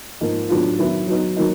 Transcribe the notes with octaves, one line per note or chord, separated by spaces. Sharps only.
G#2 F3 A#3 D#4
A2 F#3 B3 D4 F4
D#3 F#3 B3 E4
F#3 B3 D#4
F#3 A#3 D#4